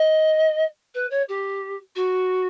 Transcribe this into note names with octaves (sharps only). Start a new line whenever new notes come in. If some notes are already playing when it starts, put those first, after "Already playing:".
Already playing: D#5
B4
C#5
G4
F#4